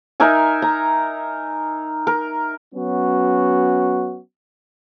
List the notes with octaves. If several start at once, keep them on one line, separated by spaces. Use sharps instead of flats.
D#4 A#4 E5 G#5
A#5
A#4
F#3 B3 C#4 F#4